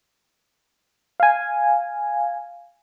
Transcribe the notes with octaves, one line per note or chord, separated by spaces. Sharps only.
F5 G#5